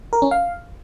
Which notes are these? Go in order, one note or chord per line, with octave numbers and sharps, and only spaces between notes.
A#4
C#4
F5